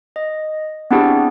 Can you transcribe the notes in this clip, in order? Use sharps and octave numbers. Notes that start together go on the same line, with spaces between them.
D#5
B3 C4 D4 E4 G4 G#4